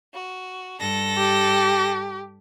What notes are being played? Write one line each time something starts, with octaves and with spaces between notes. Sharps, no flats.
F#4
G2 A4 A#6
G4